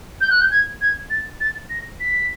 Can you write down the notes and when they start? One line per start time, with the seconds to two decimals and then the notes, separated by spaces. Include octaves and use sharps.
0.21 G6
0.30 F#6
0.41 G6
0.51 G#6
0.81 G#6
1.10 A6
1.40 A6
1.70 A#6
2.00 B6